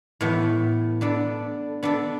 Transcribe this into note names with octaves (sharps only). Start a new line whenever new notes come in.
A2 E3 B3
B3 D4 A4
B3 D4 A4